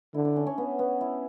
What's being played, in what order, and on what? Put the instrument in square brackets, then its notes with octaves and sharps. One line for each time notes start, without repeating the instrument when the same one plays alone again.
[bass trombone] D3 [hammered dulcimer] E4
[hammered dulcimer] D4
C#4
C#4
B3
B3
E4